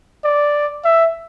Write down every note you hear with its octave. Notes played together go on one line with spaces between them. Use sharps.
D5
E5